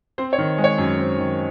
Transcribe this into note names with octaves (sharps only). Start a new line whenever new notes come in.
C4 C5
C#5
D#3
G#3
C#5
F#2
C4
D#3